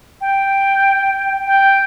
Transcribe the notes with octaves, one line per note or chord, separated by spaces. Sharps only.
G5
G5